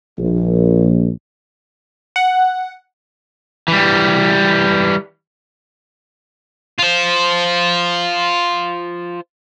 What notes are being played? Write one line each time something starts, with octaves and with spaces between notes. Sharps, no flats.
A#1
F#5
E3 G3
F4 C5